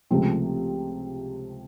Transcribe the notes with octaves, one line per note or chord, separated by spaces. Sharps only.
C#2 C3 F3 A3 C4